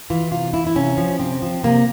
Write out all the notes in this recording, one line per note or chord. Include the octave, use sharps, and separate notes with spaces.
E3 F4
C3 F4
E3 E4
E4
C3 C#4
F3
C3 C4
F3
C3 A#3